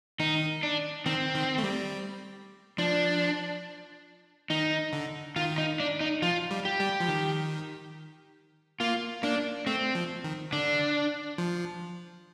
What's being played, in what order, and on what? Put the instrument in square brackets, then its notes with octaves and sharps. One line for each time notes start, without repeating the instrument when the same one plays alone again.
[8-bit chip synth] D#3 [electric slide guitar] D#4
[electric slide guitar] D4
[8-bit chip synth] D#3 [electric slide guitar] C4
[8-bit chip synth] D#3
A3
G3
[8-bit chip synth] F3 [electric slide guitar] D4
[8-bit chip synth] D#3 [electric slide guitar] D#4
[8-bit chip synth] D3
[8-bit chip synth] D#3 [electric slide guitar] F4
[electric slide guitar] D#4
D4
D#4
[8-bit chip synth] F3 [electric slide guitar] F4
[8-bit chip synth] G3
[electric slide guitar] G4
[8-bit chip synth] G3
F3
D#3
[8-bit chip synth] A#3 [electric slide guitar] F4
[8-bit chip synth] A#3 [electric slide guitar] D4
[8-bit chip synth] A3 [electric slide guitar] C4
[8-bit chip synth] F3
D#3
[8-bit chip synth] D3 [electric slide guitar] D4
[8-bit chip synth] F3